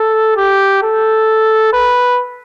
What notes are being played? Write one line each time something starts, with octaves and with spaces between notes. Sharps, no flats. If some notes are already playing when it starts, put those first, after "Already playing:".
Already playing: A4
G4
A4
B4